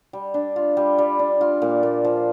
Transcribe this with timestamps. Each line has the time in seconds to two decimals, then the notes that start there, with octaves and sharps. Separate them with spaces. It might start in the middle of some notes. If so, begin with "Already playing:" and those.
0.13 G3
0.34 D4
0.56 F4
0.77 G3
0.98 G3
1.19 D4
1.41 F4
1.62 A#2
1.83 A#2
2.05 F3